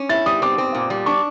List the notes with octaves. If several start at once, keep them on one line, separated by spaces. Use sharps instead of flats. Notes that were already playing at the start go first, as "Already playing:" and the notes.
Already playing: C#4
E4 A6
G3 D#6
C4 D6
C4
A#2
G3
D4 C#6